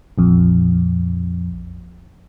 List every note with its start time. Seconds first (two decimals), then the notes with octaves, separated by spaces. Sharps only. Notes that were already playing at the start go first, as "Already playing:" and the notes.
0.18 A#1 F2